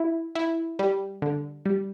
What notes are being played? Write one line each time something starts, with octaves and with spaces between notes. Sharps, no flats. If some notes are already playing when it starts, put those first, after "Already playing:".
Already playing: E4
E4
G3
D3
G3